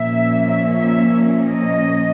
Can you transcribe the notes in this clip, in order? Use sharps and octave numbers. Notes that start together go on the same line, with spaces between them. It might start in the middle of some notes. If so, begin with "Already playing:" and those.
Already playing: A#2 F3 A#3 C#4 E5
E5
E5
D#5